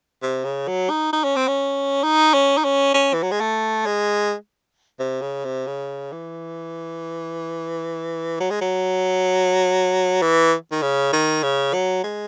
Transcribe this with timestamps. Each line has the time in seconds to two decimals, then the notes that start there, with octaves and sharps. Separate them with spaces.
0.22 C3
0.44 C#3
0.67 F#3
0.90 D#4
1.13 D#4
1.24 C#4
1.36 C4
1.48 C#4
2.03 D#4
2.34 C#4
2.58 D#4
2.64 C#4
2.94 C#4
3.13 E3
3.23 F#3
3.31 G#3
3.40 A3
3.86 G#3
4.99 C3
5.22 C#3
5.45 C3
5.67 C#3
6.12 E3
8.40 F#3
8.50 G#3
8.61 F#3
10.22 E3
10.71 D#3
10.82 C#3
11.13 D#3
11.43 C#3
11.74 F#3
12.04 G#3